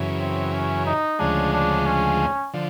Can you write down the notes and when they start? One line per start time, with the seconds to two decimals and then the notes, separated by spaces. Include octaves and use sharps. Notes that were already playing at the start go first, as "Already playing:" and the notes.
Already playing: F#2 C#3 E3
0.20 C4
0.53 C#4
0.86 D#4
1.19 D2 C#3 F3 G#3 D4
1.53 D4
1.86 C#4
2.54 D3 F3